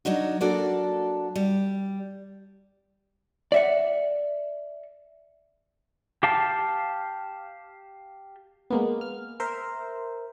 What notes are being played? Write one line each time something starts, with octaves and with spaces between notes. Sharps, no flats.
F#3 D4 D#4 F#4
F#3 A#3 D4 F#4 A4 D5
G3
D5 E5 F#5
G4 F5 A5
G#3 A#3 B3
F6
A#4 C5 E5